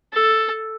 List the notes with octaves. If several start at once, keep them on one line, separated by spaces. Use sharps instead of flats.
A4